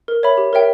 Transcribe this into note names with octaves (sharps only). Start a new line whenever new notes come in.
A#4
C#5 E5 B5
G4
A#4 C#5 E5 G5